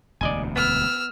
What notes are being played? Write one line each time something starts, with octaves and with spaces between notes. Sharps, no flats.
E1 D2 C3 D5 D#5 G#5
B3 E6 F6